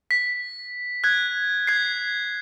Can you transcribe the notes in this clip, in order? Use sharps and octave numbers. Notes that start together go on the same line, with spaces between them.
B6
F#6 G#6
G#6 C7